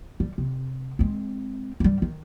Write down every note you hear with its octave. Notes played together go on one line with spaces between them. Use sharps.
G3
C3
G#3 C4
G2 G3
D#3